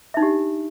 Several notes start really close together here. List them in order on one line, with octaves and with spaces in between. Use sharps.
E5 D#4 D4 G4